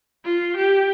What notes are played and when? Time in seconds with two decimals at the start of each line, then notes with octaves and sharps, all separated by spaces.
0.24 F4
0.56 G4